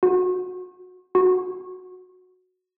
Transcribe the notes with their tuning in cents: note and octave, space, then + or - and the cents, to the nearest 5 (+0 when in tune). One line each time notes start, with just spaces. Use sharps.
F#4 -20
F#4 -10